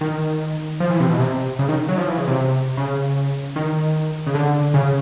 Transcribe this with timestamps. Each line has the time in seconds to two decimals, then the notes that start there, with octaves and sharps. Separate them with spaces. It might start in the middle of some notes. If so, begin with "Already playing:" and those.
0.01 D#3
0.80 F3
0.90 E3
1.00 C3
1.10 B2
1.19 C3
1.59 C#3
1.69 D#3
1.89 F#3
1.98 F3
2.08 E3
2.18 C#3
2.28 C3
2.77 C#3
3.56 D#3
4.27 C#3
4.35 D3
4.74 C#3